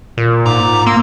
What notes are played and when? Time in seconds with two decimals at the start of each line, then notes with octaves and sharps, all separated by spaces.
0.17 A#2
0.45 G#2 A#5 D6
0.86 A#3 C6 E6